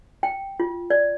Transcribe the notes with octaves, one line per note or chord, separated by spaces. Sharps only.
G5
F4
D5